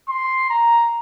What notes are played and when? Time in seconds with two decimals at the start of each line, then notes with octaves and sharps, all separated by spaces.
0.09 C6
0.50 A#5